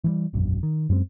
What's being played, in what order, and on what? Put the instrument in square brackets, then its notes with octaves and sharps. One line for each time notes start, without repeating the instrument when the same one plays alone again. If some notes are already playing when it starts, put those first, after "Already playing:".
[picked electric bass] E3 F3 G3
E1 A#1 F#2
D#3
F#2 G#3 C4